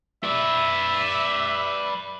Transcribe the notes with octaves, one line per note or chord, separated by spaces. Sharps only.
B4 D5 E5